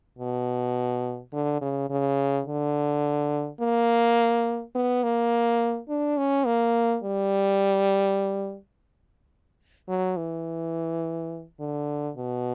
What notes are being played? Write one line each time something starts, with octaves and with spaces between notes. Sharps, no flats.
B2
D3
C#3
C#3
D3
A#3
B3
A#3
D4
C#4
A#3
G3
F#3
E3
D3
B2